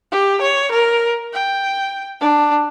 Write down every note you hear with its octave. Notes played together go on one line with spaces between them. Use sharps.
G4
C#5
A#4
G5
D4